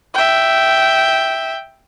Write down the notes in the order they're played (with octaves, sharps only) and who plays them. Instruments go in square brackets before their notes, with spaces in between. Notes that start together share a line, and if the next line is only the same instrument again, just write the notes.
[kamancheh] E5 G5